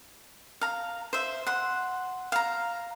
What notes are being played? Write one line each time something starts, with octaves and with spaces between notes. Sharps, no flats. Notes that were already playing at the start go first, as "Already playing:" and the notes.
F5 A#5
C5 E5
F#5 C6
F5 A#5